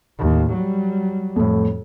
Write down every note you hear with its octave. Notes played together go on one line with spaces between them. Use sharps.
D#2 A2
F#3 G3
F2 A2